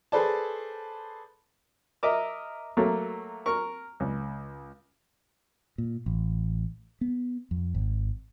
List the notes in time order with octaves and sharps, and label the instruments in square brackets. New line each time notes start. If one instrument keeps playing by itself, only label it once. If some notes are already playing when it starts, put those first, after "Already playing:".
[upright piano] G#4 A4 B4 C5 D5 A5
[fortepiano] A#4 D#5 E5 D6
F#3 A3 A#3
A#4 C#6
C#2
[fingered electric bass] A#2
A1
B3
F2
G#1